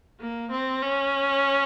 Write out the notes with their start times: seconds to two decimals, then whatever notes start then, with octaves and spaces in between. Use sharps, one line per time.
0.20 A#3
0.51 C4
0.82 C#4